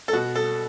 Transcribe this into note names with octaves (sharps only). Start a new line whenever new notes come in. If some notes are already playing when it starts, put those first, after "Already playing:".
A4
B2 F#4
A4